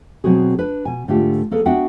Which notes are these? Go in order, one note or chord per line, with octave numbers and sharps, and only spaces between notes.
B2 F#3 C4 F#4 G#4
D4 B4
B2 G#5
G#2 D3 A3 D4 F4 G4
A#3 G#4 A4 B4
B3 D4 F#4 E5 F#5 G5